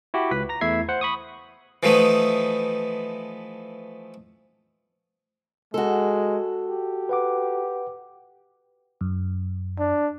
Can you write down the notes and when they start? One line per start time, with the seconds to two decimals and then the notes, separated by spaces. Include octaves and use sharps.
0.14 E4 F#4 G4
0.31 C#2 B4 B6
0.49 A#5 A#6
0.61 E2 A3 E4 E5 G#6 C7
0.89 C5 F#5
1.01 B5 C#6 D#6
1.83 E3 F3 A3 B3 D#4
5.74 G#3 F#4 A4
6.70 G4
7.09 B4 F#5 D6
9.01 F#2
9.79 D4